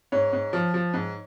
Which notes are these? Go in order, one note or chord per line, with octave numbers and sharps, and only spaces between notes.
G#2 C#5
G#2
F3
F3
G#2